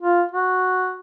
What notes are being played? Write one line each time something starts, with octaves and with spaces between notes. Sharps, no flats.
F4
F#4